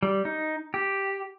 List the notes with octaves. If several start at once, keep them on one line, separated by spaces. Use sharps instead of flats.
G3
D#4
G4